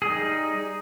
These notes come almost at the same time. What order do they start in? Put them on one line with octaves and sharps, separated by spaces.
G#4 G3 D#4